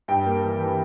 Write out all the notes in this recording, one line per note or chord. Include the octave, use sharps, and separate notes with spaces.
G2 G5
A#3
E3
E3